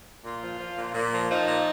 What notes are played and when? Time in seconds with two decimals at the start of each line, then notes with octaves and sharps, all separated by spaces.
0.24 A#2 F4
0.42 F3
0.59 F3
0.77 A#2
0.94 A#2
1.12 F3
1.30 F3 D#4
1.47 A#2